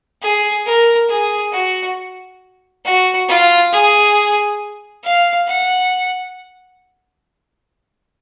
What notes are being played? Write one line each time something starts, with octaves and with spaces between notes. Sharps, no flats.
G#4
A#4
G#4
F#4
F#4
F4
G#4
F5
F#5